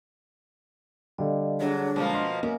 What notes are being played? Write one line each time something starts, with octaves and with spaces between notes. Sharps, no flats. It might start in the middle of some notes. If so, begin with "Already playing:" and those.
D3 G3 D5 D#5 F5
F#3 D4 G#4 C#5 F#5
B2 F3 G#3 A#3 A5
D#5 C6
F#2 A#3